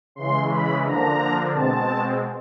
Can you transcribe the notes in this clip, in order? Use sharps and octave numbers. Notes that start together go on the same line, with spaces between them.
C#3 E3 G#3 C6
B5
D3 F3 A#3 D4 A#5
B2 G#3 C4 A5